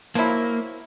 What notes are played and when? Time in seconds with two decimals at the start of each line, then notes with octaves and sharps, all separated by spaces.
0.15 F3 F#3 A#3 E4